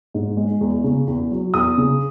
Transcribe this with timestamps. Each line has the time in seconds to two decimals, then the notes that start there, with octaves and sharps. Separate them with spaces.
0.14 G#2
0.37 G#3
0.61 E2
0.84 C#3
1.07 E2
1.31 F#3
1.54 E2 D#6
1.78 C#3